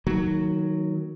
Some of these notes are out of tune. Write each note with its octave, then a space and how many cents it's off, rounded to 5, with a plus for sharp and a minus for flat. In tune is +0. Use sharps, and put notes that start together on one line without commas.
D#3 +10 F#3 +0 A#3 -35